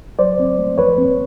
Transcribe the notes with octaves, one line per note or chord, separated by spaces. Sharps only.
F#3 C5 D5
C4
A3
F3 B4 C#5
C4